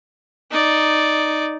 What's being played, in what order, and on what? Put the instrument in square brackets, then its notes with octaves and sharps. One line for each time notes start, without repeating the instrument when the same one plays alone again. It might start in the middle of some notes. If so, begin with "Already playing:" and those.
[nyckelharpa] D#4 D5